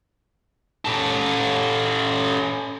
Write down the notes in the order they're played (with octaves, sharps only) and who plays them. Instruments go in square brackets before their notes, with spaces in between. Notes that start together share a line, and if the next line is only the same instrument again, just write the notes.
[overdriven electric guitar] C#4 A4